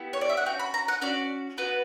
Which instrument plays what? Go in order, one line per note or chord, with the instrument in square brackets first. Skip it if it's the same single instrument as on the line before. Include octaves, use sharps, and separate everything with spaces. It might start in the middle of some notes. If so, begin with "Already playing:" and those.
Already playing: [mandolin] B3 E4 G4
C#5
D5
E5
F#5
C#4 F#4 G5
B5
A#5
F#5
C#4 F#4 D5
B3 F#4 B4